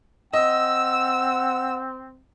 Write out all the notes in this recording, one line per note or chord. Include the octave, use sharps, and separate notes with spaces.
C4 D#5 F#5 E6